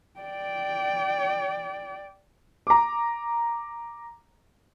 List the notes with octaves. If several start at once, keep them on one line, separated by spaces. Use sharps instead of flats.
D5 G5
A#5 D6